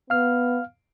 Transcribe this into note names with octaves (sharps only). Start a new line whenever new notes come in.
B3 F5 F6